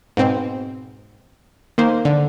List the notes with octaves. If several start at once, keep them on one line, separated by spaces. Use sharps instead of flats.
G#2 B2 C4
D#3 A#3 C5
D3